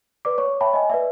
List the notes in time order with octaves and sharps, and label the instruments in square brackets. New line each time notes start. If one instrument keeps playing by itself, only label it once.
[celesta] B4 D5 D6
C#5 C#6
C#5 E5 G5 A5 B5
D#5 G#5
B4 D5 E5